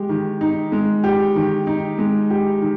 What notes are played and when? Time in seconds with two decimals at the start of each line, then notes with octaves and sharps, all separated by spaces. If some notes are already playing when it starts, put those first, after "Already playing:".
Already playing: G#3 G4
0.09 D#3
0.41 D#4
0.72 G#3
1.04 G4
1.35 D#3
1.67 D#4
1.98 G#3
2.30 G4
2.62 D#3